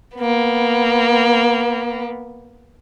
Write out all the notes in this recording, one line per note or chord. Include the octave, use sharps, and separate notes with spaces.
A#3 B3